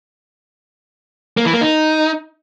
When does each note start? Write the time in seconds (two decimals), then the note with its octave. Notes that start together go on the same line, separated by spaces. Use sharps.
1.37 A#3
1.45 E3
1.53 A#3
1.61 D#4